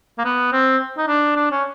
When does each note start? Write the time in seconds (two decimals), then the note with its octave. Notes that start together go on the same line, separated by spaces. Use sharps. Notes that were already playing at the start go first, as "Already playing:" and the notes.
0.19 A#3
0.25 B3
0.52 C4
0.98 D#4
1.08 D4
1.36 D4
1.52 C#4